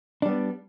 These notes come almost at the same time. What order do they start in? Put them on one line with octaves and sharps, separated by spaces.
D4 G3 B3